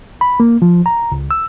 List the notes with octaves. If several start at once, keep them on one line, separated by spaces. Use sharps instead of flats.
B5
A#3
F3
A#5
C#2
E6